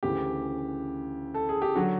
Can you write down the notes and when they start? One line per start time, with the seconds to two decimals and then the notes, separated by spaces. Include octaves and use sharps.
0.03 D2 C#3 E3 G4
1.34 A4
1.49 G#4
1.62 G4
1.76 D3 F#3 F#4